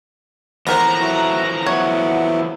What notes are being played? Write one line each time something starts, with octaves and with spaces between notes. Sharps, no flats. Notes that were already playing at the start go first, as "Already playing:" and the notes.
E3 F3 B3 A4 A#4 C5 A#5 F#6
F#3 E4 F#4
F#3 B3 E4 C#5 F#5